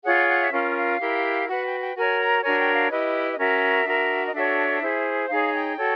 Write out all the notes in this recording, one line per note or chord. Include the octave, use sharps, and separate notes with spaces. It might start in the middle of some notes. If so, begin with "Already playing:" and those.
F4 G#4 C#5 F#5
F#5
E5
C#4 F4 A#4 F5
F5
E4 G4 A#4
F#4 B4 F#5
G5
G5
F#4 A#4 C#5 G#5
A#5
D4 F#4 A#4 C#5 G#5
G5
F5
E4 G4 B4 D#5
D#5
C#4 F#4 A#4 E5
D4 F#4 A#4
D#5
D4 F#4 A4 C#5 E5
E4 G#4 C5
D#4 G#4 C#5 F5
G5
F#4 A4 C#5